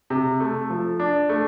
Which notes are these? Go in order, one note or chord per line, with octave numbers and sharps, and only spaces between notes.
C3
A3
F3
D4
A3